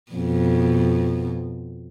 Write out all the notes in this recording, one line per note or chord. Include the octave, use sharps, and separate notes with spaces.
F2 B2